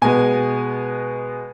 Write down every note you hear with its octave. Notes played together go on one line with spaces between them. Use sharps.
B2 G#3 B3 G#5